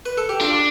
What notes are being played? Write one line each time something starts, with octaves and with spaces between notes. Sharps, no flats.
B4
A4
G4
D4 F4